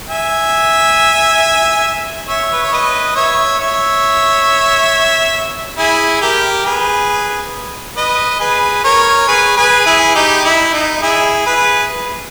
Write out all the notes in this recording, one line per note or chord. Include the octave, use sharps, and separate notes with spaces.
E5 G#5
C#5 E5
B4
C#5
B4 D#5
C#5 E5
C#5 E5
E4 G#4
G4 A#4
G#4 B4
B4 D#5
G#4 B4
A#4 C#5
G#4 B4
G#4 B4
E4 G#4
D#4 G4
E4
D#4
E4 G#4
G#4 B4